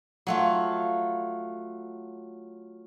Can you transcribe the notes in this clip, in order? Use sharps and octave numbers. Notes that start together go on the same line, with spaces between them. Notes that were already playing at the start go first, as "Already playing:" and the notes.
F#3 A3 F4